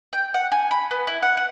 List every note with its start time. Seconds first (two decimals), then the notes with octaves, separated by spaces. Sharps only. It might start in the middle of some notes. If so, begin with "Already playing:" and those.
0.13 G5
0.34 F#5
0.52 G#5
0.71 B5
0.91 B3
1.07 E4
1.23 F#5
1.37 F#5